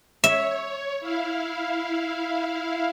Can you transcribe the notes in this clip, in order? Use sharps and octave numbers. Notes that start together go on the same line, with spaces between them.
C#5 E5
E4 F5